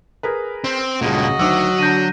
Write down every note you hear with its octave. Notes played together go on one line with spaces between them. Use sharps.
G#4 A#4 B4
C4
C#2 G2 A#2 C#3 F#4 D#5
D2 D#3 F#3 D6 E6
D3 D4 G6 A#6 D#7